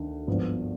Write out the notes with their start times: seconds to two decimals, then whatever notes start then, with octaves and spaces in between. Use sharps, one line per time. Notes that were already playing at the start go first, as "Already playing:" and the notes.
Already playing: D2 D#3
0.27 G#1 G2 F3 B3